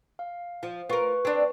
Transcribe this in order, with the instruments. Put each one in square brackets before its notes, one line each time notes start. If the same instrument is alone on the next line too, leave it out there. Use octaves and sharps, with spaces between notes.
[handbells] F5
[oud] F3
[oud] F4 A#4 [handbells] B4 C#6
[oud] C4 D4